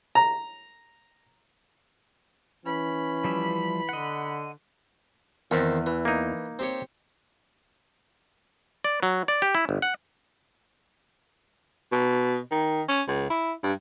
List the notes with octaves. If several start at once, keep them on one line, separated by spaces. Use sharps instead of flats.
A#5
E3 C#4 B5
F3 G3 E5
D3 D#5 F#5
E2 D#3 C4
E3
A#3 D#4
C4 G4 C#5
D5
F#3
D5
G4
E4
G1
F#5
B2
D#3
C#4
C#2
E4
G2